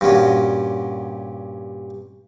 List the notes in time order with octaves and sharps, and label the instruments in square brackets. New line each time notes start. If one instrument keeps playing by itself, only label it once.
[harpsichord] G2 A#2 C#4 F#4